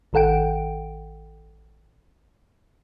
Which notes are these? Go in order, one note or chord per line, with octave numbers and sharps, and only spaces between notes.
A1 D#3 A4 F#5 G5 D7